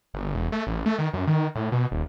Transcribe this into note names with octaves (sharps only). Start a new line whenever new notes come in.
G1
E1
A3
A1
A3
D#3
F#2
D#3
A2
B2
D#1